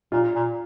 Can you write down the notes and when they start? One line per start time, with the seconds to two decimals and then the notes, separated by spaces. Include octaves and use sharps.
0.12 A#2 F4
0.36 A#2